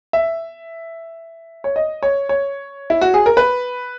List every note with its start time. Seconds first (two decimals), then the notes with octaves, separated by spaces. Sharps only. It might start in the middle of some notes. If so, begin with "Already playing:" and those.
0.13 E5
1.64 C#5
1.76 D#5
2.03 C#5
2.29 C#5
2.90 E4
3.01 F#4
3.14 G#4
3.26 A#4
3.37 B4